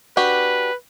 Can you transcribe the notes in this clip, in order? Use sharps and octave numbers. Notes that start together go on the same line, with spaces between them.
D4 F#4 G4 B4